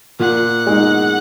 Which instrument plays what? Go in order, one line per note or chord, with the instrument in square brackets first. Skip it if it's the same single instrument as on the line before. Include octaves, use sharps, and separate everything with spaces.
[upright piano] A#2 [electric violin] F#5
[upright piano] G#3 D#4